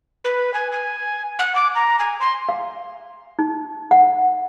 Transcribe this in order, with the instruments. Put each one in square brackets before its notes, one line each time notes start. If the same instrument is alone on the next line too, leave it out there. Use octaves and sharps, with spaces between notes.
[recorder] B4
G#5
G#5
F#5
D6
A#5
G#5
C6
[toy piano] F5
D#4
F#5